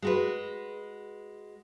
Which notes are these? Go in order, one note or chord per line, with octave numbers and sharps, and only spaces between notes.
G#3 F#4 B4